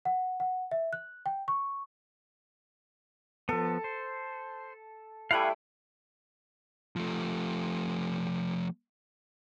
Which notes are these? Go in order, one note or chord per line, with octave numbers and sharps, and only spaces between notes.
F#5
F#5
E5
F#6
G5
C#6
F3 B3 A4
C5
G3 A3 E4 F5 F#5 G#5
F3 A3